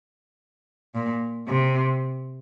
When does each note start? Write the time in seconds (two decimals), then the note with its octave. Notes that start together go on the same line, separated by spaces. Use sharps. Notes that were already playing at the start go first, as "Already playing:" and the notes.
0.95 A#2
1.48 C3